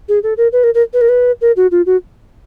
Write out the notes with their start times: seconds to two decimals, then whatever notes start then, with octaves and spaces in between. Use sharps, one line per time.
0.09 G#4
0.23 A4
0.37 A#4
0.52 B4
0.63 A#4
0.74 A#4
0.93 B4
1.01 A#4
1.09 B4
1.41 A#4
1.56 F#4
1.71 F4
1.86 F#4